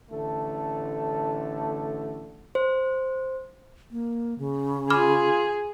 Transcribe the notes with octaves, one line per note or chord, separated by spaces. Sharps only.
A1 D3 A3 A4
C5
A#3
C#3
F4 G#4 B5 D6 F6